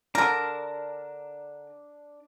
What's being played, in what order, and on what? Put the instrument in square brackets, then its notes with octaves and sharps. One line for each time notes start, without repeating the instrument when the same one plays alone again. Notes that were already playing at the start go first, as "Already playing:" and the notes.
[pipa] D3 A#4 [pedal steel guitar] D4 A5